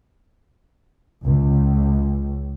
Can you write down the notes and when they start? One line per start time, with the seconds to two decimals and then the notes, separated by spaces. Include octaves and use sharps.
1.24 C#2